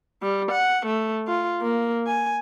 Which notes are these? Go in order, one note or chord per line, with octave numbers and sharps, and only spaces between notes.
G3
F#5
A3
F4
A#3
G#5